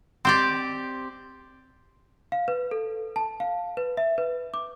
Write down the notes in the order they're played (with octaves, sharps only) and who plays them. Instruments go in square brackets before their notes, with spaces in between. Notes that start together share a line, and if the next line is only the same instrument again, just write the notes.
[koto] C4 G4 D5
[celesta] F5
B4
A4
A5
F5
B4
E5
B4
D6